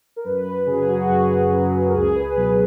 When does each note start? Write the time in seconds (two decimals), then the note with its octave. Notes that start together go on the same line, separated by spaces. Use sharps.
0.16 A#4
0.24 F#2 B4
0.66 C#3 F#3 G#4
0.88 F#4
1.09 F#2 G#4
1.51 C#3 F#3
1.88 A#4
1.93 C#2 G#4
2.14 B4
2.36 B2 F#3